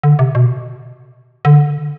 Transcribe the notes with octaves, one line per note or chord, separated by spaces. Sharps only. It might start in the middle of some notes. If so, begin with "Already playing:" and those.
D3
C3
B2
D3